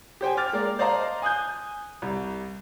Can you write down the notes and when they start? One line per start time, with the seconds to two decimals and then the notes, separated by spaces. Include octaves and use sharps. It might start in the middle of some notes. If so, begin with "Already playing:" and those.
0.21 G4 C5 G5 G#5
0.37 D6 F6 A6
0.53 G#3 A#3 A#4 D5
0.79 C5 D5 D#5 F5 A5 A#5
1.22 G#5 D#6 F#6 G6
2.02 C2